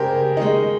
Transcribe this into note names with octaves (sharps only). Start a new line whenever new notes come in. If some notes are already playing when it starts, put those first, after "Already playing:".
Already playing: C#3 G#3 G4 G#4 A#4 C5
D#3 G#3 D#4